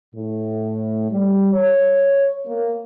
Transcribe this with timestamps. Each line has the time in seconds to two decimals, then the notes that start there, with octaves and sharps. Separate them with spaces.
0.15 A2
1.10 G3
1.53 C#5
2.46 A#3